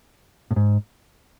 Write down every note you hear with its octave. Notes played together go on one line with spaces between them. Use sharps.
A2
G#2